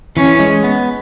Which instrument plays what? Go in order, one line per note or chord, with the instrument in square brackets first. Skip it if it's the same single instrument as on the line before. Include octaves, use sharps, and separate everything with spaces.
[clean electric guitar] E3 [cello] C#4
[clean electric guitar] G#3
B3